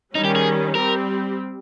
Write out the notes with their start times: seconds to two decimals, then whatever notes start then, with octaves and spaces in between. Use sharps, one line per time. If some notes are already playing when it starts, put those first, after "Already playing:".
0.15 D#3 G3 C#4 D#4
0.25 G4
0.36 G#4
0.74 G3 C4 G4 A#4